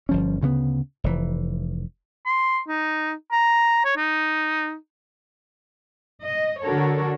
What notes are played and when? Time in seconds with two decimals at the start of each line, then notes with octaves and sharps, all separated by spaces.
0.09 G1 F3 C#4
0.41 D2 C#3 G#3 B3
1.04 F1 E3
2.26 C6
2.68 D#4
3.32 A#5
3.85 C#5
3.97 D#4
6.24 D#5
6.62 D3 D4 F#4 A4 A#4 C#5